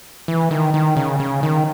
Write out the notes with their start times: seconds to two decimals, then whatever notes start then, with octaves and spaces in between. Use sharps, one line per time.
0.28 E3
0.51 D#3
0.74 D#3
0.97 C#3
1.20 C#3
1.43 D#3